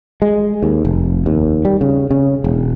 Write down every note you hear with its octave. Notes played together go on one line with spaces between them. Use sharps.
G#3
D#2
F1
D#2
G3
C#3
C#3
E1